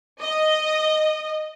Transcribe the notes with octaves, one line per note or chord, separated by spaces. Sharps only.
D#5